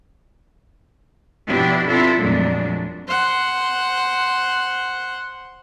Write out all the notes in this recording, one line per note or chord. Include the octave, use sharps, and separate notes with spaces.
B2 F3 B3 D4 E4 G4
C4 D4 E4 F4 A4
F2 A#2 F#3 G#3 A3 D4
C5 F#5